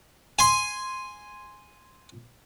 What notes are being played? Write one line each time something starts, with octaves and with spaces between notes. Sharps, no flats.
G#5 C6